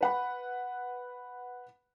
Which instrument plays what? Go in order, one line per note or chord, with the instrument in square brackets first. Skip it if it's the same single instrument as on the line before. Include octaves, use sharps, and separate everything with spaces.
[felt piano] B4 F#5 B5